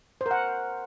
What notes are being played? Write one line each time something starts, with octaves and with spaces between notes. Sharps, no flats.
C5
A#4
F#5